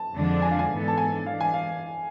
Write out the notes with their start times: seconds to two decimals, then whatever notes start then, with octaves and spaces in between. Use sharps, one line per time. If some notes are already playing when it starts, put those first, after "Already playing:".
Already playing: A5
0.14 F2 D3 F3 G#3 D4
0.42 G#5
0.51 F5
0.59 G#5
0.70 G#2 E3 B3 D4 A4
0.88 A5
0.98 G#5
1.26 E3 G#3 D4 F5
1.41 G#5
1.54 F5